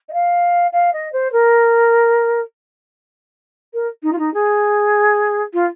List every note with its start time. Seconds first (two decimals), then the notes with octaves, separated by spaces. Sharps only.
0.08 D#5
0.13 F5
0.72 F5
0.93 D#5
1.12 C5
1.32 A#4
3.73 A#4
4.03 D#4
4.12 F4
4.18 D#4
4.34 G#4
5.53 F4